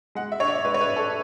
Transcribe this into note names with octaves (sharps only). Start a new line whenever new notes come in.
G#3 F#5
E5
D4 C#5
D5
G#3 B4
C#5
B4
D4
A4